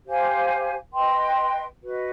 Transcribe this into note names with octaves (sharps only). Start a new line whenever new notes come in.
G4 C5 F5 G#5
B4 D#5 G5 C6
F#4 B4 D#5